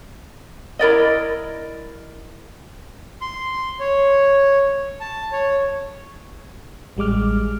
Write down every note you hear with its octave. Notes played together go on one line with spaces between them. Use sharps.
E4 A#4 D5 D#5
C6
C#5
A5
C#5
A1 G3 G#3 D6 F6